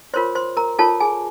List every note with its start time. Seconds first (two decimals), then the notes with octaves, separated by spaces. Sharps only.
0.14 F4 A#4 C5 C#5 C6
0.35 C5 C6
0.57 A#4 A#5
0.79 F4 A4 A#4 C#5 A5
1.00 G#4 G#5